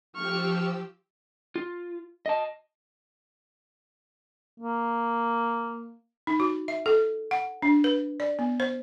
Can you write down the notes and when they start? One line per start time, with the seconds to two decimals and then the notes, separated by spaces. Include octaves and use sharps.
0.16 F3 G4 C#6 E6 F6
1.56 F4
2.26 D#5 A5
4.60 A#3
6.27 D#4
6.40 F#4
6.68 E5
6.86 A4
7.31 F#5
7.62 D4
7.84 B4
8.20 D5
8.39 B3
8.60 C5